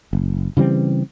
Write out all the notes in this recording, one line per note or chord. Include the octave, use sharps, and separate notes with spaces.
F#1
C#3 E3 G3 C4